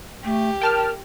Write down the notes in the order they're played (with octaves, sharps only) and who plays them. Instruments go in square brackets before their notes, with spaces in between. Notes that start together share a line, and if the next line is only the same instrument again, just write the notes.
[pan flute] A3 [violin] G4
[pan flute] A#4 [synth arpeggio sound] G5 A5 F6